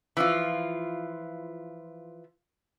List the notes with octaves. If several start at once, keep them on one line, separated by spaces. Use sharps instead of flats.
E3 F3 F4